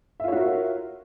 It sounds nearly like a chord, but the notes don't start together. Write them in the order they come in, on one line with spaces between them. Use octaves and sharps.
E5 F4 C#5 F#4 A#4